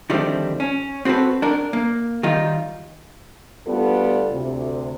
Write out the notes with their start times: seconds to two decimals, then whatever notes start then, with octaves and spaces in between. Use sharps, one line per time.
0.10 D3 D#3 F3 G3 A3 C4
0.60 C#4
1.05 C4 F#4 G#4 A4 B4
1.42 D4 A#4
1.73 A#3
2.23 D#3 G3 D#4 F4
3.67 D2 G3 B3 F4 A4
4.32 D2 C3